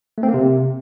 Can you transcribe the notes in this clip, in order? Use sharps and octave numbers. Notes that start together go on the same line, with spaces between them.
A3
C4
A#3
C3